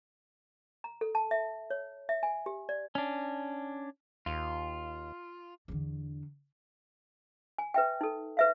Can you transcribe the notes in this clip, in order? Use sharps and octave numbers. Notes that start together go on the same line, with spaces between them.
A#5
A4
A5
E5
C#5
E5
G#5
G4
D5
C#4 D4
D#2 F4
E2 D3
G#5
B4 E5 G5
D#4 A4
B4 E5 F5